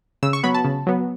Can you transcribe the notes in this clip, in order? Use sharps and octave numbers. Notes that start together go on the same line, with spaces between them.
C#3 E6
C#6
F#3 B3 B5
A5
C#3
F#3 B3